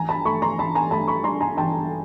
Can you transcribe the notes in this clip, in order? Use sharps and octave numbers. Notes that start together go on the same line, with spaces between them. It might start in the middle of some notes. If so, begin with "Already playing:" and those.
Already playing: A1 G#5 A#5
A5 B5
A3 B5 C#6
A#5 C6
A1 A5 B5
G#5 A#5
A3 A5 B5
B5 C#6
G2 A#5 C6
G#5 A#5
A1 G5 A5